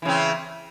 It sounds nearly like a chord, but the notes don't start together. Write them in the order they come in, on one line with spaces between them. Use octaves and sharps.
E3 C#3 C4